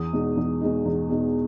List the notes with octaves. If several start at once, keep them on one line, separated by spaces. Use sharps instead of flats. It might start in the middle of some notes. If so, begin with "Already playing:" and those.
Already playing: E2 D#6
B2 G#3 D#4
E2
B2 G#3 D#4
E2
B2 G#3 D#4